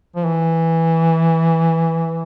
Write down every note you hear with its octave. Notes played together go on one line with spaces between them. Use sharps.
F3
E3